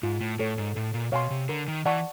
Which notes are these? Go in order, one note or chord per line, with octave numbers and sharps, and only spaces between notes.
G#2 F4
A2
A2 A4 C#5
G#2
A2 A4
A#2
B2 C#5 F5 G#5 C6
C3
D3 A#4
D#3
E3 D5 F#5 A5 C#6